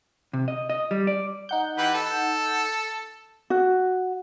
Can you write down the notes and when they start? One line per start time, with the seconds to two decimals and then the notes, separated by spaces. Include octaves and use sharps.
0.33 C3
0.48 D#5
0.70 D#5
0.91 G3
1.07 D5
1.49 D#4 F#5 G6
1.78 E3 G4 B4
1.94 A4
3.50 F#4